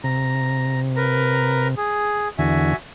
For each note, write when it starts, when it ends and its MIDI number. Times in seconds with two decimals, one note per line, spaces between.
0.04 1.75 48
0.04 0.80 82
0.96 1.68 70
0.96 1.68 71
0.96 1.68 82
1.77 2.28 68
2.39 2.74 40
2.39 2.74 50
2.39 2.76 66
2.39 2.76 76
2.39 2.76 80